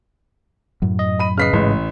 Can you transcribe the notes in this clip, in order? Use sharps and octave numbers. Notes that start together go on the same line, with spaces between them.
F#2 A2 F#3
D#5
B5 D#7
C#3 B4 D#5 F6 B6 C7
A1 G#2 G#3